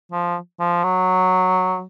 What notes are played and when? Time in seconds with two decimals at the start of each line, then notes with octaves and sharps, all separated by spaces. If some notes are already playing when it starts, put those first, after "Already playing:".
0.12 F3
0.60 F3
0.84 F#3